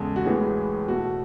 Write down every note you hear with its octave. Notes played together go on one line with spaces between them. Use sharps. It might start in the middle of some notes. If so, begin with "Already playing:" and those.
Already playing: E2 C#3 G#3 A4
F#4
A2 E3 G#3 B3 G#4
B2 A3 F#4